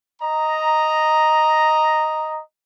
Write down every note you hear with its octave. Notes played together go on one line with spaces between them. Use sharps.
D#5 A#5